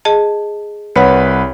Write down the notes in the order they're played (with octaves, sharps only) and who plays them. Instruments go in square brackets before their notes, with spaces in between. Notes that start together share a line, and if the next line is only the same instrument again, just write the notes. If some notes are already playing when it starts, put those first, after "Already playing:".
[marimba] G#4 D#5 A5
[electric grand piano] C2 B4 B5 [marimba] C#5 F#5